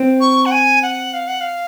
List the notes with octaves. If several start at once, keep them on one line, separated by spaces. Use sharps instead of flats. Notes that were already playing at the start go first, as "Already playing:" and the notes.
Already playing: C4
C#6
F#5
G#5
F#5
F5
F#5
F5